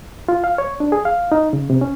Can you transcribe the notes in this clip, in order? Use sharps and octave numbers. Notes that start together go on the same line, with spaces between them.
F4
F5
C#5
D4
G#4
F5
D#4
C#3
C3
C#4